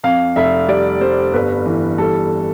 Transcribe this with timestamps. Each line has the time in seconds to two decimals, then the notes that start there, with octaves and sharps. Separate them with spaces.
0.04 F2 F5
0.36 F1 E5
0.68 G3 D5
1.01 G3 C5
1.33 G1 B4
1.66 E3
1.98 G3 A4